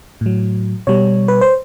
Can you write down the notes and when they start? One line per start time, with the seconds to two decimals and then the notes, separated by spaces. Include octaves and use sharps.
0.21 A2 F#3
0.87 B2 G3 C#5
1.28 B4
1.41 C5